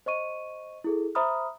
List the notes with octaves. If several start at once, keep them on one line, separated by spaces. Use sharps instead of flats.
C5 D#5 C#6 D#7
E4 G#4 A4
C5 E5 A#5 B5 D#6 F6